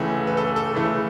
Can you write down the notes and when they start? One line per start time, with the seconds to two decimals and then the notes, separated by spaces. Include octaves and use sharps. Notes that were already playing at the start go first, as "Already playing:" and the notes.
Already playing: C#2 C#3 E3 A3 G#4
0.27 B4
0.37 A4
0.47 G#4
0.56 A4
0.74 C#2 C#3 E3 A3 A4